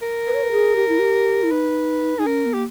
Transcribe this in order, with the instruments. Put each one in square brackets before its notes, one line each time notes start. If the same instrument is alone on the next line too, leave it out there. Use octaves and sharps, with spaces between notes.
[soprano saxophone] A#4
[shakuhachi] B4
C#5
B4
G#4
G4
E4
G4
E4
[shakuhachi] D#4 [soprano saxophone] B4
[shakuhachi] D#4 [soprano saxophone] G#4
[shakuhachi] C#4 [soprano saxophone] A#4
[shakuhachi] B3
[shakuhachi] A#3 [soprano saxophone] G4